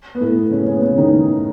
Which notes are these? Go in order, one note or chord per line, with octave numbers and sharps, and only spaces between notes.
B3
A2 A3
C#3 C#4
C#3 C#4
B3
C#3 C#4
D#3 D#4